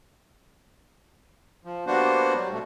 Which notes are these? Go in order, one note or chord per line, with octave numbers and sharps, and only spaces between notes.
F3
G3 A#3 B3 D4 F#4 C5
F#3 G3
B2 A3